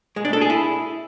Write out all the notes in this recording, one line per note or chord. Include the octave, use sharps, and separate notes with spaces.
G#3
D4
A4
G#4
E4